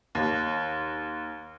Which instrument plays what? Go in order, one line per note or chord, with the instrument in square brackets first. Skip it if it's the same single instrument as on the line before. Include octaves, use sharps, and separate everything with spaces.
[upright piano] D#2